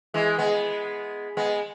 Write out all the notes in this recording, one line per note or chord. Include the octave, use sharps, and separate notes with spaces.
E3 G#3
G#3 B3
G#3 B3